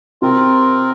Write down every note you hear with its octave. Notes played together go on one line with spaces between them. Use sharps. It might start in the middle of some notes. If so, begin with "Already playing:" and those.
C3 C4 F4 A#4